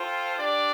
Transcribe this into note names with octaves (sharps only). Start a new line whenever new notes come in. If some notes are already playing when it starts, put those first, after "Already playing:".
Already playing: F4 A4 C5 G5
D4 G4 D5